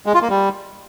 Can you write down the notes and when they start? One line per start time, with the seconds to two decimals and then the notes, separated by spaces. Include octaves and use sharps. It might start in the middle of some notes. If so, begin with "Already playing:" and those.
0.06 G#3
0.14 F4
0.22 A#3
0.30 G3